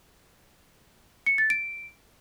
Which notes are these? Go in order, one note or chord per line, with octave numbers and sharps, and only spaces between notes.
C#7
A6
D7